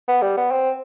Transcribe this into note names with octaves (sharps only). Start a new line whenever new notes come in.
B3
G3
B3
C4